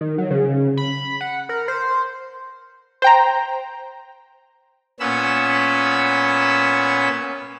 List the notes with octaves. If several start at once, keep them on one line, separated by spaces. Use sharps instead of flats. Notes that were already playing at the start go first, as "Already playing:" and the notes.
D#3
F#3
C#3
B5
F#5
A#4
C5
C5 G5 A#5
A#2 B3 C#4 B5 E6